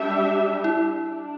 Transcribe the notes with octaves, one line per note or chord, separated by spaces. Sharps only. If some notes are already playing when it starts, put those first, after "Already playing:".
Already playing: G3 D4 G4 E5
E4
D4